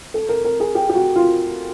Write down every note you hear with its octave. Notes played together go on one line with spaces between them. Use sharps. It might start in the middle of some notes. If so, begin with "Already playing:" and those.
A4
A#4
A#4
G#4
G4
G4
F#4
F4